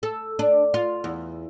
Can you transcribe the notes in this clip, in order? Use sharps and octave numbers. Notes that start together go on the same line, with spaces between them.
A4
D4
F4
E2